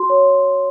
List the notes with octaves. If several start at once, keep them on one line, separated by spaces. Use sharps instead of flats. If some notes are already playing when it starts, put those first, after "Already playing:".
Already playing: F#4 C6
C#5